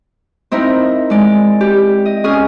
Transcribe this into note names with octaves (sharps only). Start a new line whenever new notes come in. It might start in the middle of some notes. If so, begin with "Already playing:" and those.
C4 D#4 E4 A#4
G#3 D5
G4
D#5
C#4 G#4 G#5 D#6 F6